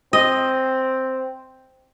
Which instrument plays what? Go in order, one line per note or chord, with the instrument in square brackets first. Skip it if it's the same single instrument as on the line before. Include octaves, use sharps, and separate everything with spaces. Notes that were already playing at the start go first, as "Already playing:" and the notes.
[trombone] C4 [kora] D#5